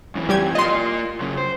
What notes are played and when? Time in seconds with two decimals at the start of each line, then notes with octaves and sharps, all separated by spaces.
0.15 F#2 E3
0.29 G3 G4 G#6
0.55 A#3 F4 D#5 C6
1.21 F#2 C#3
1.37 C5